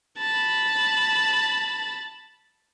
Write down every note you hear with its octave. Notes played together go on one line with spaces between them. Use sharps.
A5 B5